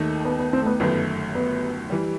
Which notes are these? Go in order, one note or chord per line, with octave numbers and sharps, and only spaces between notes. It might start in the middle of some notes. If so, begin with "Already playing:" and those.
Already playing: D#2 D#3 A3 D#4 A4
B3
B3
C4
A3
B3
G1 F#2 D#3 A3 B3
B3
E3 G3